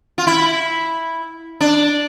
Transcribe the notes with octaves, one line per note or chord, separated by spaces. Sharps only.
F4
E4
D4